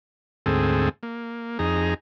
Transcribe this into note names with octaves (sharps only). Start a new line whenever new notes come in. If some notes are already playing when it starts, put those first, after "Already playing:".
D2 G#2 C4 G#4 A4
A#3
F2 D#4 G#4 A#5